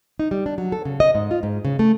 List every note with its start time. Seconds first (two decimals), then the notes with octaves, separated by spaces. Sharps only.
0.19 D#4
0.31 G3
0.46 D4
0.58 F#3
0.72 A4
0.85 C#3
1.00 D#5
1.15 G#2
1.31 F4
1.43 G#2
1.65 C#3
1.79 A3